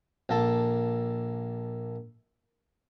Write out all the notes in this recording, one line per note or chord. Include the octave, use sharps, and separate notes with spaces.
A#1 A#3 A4 A5